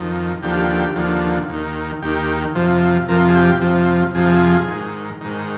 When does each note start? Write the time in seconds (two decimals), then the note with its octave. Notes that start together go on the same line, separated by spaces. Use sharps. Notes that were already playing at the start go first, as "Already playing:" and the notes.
Already playing: F2 D#3
0.43 D#2 D3 F3 G4
0.96 D#2 D3 F3
1.49 D#2 D#3
2.02 D#2 D#3 G4
2.55 F2 C3 F3
3.08 F2 C3 F3 A#4
3.28 G#4
3.35 G4
3.61 F2 C3 F3
4.15 F2 C3 F3 G#4
4.67 G#2 D#3
5.21 G#2 D#3